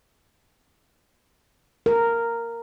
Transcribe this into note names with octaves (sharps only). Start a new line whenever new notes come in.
A#4